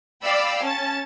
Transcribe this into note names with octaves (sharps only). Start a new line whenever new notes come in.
D5 F5 G5 B5 E6
C#4 A5 A6